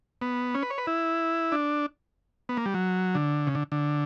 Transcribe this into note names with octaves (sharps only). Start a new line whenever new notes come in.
B3
C#4
B4
C#5
B4
E4
D4
B3
A#3
G3
F#3
D3
C#3
D3
D3